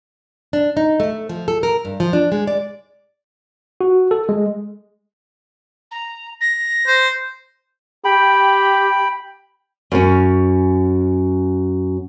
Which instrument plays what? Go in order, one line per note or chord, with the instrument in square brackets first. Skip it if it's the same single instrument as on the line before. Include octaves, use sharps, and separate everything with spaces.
[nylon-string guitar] D4
D#4
A3
F3
A4
A#4
G2
F3
D4
G#3
D5
[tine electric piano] F#4
A4
G#3
[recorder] A#5
A#6
[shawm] C5
[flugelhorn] G4 [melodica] G5 B5
[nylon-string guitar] F#2 C#4